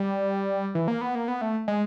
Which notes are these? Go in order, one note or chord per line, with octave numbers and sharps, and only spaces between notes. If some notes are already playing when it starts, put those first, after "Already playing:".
Already playing: G3
E3
A#3
B3
A#3
B3
A3
G#3